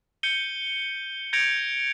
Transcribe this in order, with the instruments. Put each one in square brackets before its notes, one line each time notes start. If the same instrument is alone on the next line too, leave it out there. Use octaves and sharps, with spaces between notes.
[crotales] G6 C#7 D#7 G7
G6 G#6 A#6 C#7 D7 F7